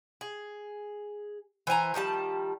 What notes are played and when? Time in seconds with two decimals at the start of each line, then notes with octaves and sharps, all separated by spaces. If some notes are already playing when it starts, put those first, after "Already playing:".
0.21 G#4
1.67 E3 C5 G#5 A#5
1.94 D#3 F3 G3 A5